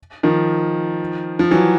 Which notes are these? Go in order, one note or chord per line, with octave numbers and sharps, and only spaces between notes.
D#3 F3
F3
E3 F#3